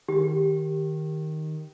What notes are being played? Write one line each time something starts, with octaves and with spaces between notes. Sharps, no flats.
D#3 G4